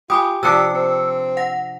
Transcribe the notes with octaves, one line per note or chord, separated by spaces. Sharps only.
F4 G4 G#5 B5 D#6
C3 F3 D4 G4 E6 C#7
C4
F#5 A#6